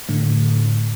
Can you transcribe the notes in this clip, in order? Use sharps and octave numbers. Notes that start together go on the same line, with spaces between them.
A2 D3